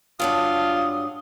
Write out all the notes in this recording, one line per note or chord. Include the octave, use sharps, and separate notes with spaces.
G2 F#3 D4 F4 D#6